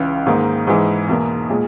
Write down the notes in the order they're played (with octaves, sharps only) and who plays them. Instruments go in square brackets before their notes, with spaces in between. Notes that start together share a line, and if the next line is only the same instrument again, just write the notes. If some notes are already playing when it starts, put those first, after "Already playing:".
Already playing: [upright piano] C#2 C#3 E3
G#2 D#3 A#3 D#4
G#2 E3 G#3
E2 B2 A#3
A#2 G#3